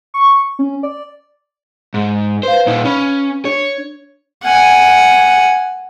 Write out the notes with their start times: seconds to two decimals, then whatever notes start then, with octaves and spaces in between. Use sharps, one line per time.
0.14 C#6
0.59 C#4
0.83 D5
1.94 G#2
2.43 B4 C5 F5
2.67 A#2 D#4
2.85 C#4 B5
3.45 D4 C#5
4.43 F#5 G#5